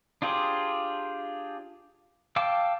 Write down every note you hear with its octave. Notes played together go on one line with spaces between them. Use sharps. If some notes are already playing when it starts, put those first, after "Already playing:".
D4 F4 G4 G#4 C5
F5 G5 A5 D6 E6